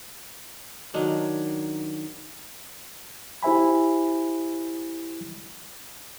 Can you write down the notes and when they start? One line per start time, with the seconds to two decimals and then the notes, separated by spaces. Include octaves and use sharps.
0.94 D#3 F#3 D4 D#4
3.43 E4 G4 C5 E5 G#5 B5